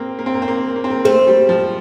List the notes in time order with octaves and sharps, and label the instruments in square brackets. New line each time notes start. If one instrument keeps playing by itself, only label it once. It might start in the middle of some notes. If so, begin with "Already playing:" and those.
Already playing: [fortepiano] A#3 C4
A#3
C4
A#3
C4
A#3
A#3
C4
A#3
[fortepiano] A3 [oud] C4
[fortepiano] G3
F3